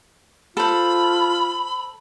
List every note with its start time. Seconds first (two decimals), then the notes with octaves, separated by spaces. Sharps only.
0.57 F4 A4 C5 B5